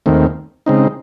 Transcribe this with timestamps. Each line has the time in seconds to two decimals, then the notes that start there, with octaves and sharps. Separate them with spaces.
0.06 D#2 D#3 A3 C4
0.66 C#3 G#3 C4 D#4